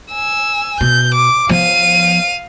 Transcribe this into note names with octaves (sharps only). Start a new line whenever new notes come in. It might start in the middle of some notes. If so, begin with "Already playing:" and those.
G#5 E6
B2 G6
D6
F3 B3 F5 D#7